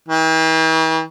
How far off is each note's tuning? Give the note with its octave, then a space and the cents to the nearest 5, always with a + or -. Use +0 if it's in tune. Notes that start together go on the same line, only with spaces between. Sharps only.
E3 -45